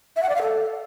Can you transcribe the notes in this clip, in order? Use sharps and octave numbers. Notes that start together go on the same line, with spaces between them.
E5
F#5
D5
F5
A4